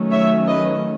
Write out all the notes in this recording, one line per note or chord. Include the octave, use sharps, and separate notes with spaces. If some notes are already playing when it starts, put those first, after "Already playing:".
Already playing: D#3 F#3 A3 C#4
C#5 E5
B4 D#5